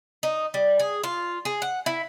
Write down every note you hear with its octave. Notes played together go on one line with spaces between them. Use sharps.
D#4
G3
G#4
F4
G#4
F#5
E4